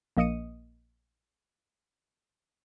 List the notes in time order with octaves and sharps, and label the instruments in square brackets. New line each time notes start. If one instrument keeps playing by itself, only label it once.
[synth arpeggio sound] A#1 A#3 D#5 D#6 C#7 D#7